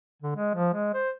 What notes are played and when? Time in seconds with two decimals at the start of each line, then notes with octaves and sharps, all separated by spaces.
0.22 D3
0.36 G#3
0.55 F3
0.74 G#3
0.94 C5